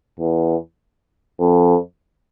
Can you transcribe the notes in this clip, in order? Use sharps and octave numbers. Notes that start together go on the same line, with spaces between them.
E2
F2